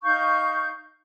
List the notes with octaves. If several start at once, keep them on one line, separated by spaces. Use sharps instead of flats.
D#4 F5 C#6 G6